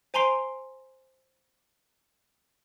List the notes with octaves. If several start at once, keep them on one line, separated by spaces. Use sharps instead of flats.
C5 G#5 A#5 C6 C7 D7